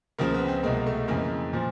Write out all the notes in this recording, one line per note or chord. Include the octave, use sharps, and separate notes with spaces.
C#2 C#3 F3 A#3
B3
C4
C2 B2 G#3 A#3
A3
F2 C#3 E3 G#3 A#3
A#2 F3